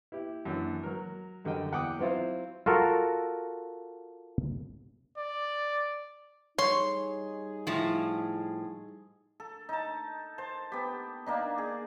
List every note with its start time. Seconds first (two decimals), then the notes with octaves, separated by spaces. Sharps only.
0.12 E4 G4
0.45 F#2 E3 D4
0.83 F#3 A#4
1.45 F#2 D3 G3 A#4 D#5 G5
1.72 E2 F#5 G5 D6 D#6
1.99 F#3 C4 E4 F4 C5
2.66 F4 F#4 A4 A#4
5.17 D5
6.58 G3 D#4 G#4 C#5 C6
7.67 A2 F3
9.40 A4
9.69 D#4 A5
10.38 C5 A5
10.72 B3 G4
11.26 A#3 D4 D#4
11.58 G#4